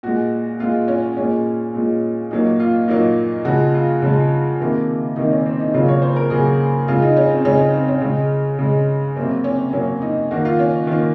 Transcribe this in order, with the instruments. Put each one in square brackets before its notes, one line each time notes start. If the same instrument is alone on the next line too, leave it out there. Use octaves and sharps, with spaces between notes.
[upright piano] A#2 G#3 F#4
A#2 G#3 F4
C#4
A#2 G#3 C#4
A#2 G#3
A#2 F#3 A#3 D#4
F4
A#2 F#3 A#3 D#4
C#3 F3 G#3 F#4
F4
C#3 F3 G#3
C3 D#3 A#3
C3 D#3 A#3 D#4
C#4
C4
D#4
C#3 F#3 A#3 F4
C#5
C5
A#4
C#3 F#3 A#3 G#4
C#3 G#3 F4
D#4
C#4
C4
C#3 G#3 C#4
C#4
C4
C#4
C#3 G#3
C#3 G#3
C3 F#3 A#3 C4
C#4
C3 F#3 A#3 C#4
D#4
D#3 A#3 F#4
F4
C#4
D#3 A#3 F4